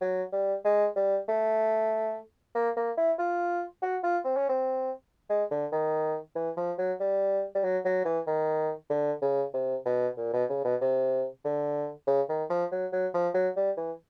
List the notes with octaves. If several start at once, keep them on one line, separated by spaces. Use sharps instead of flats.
F#3
G3
G#3
G3
A3
A#3
A#3
E4
F4
F#4
F4
C4
C#4
C4
G#3
D3
D#3
E3
F3
F#3
G3
G3
F#3
F#3
E3
D#3
D3
C#3
C3
B2
A#2
B2
C#3
B2
C3
D3
C#3
D#3
F3
F#3
F#3
F3
F#3
G3
E3